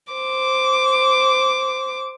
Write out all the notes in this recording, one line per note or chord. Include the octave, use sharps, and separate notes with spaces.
C5 D6